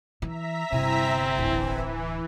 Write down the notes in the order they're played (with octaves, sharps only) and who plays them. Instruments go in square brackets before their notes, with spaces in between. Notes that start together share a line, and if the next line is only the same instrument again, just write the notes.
[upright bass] E3 [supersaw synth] E5 A#5 B6
[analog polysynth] G1 E4 G#5 [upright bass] C3 [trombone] C4
[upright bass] D1 [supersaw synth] E3